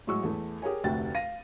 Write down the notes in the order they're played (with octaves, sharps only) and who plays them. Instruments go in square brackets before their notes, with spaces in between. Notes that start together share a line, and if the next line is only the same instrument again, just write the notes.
[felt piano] A2 F#3 G#3 C#6 E6
E2 A3
G4 G#4 A#4 C#5 G#5
F1 D2 C3 F#4 G5 A6
F5 A#6 D#7